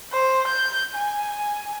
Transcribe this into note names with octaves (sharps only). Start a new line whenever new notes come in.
C5
G6
G#5